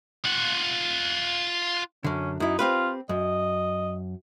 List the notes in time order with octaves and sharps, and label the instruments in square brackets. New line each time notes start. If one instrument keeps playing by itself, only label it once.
[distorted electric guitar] F4 F#5
[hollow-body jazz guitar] F#2 D3 [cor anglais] C#4
[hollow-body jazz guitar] F#2 E4 [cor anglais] D#4
[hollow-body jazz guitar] C4 G4 B4 [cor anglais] F4
[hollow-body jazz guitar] F#2 [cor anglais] D#5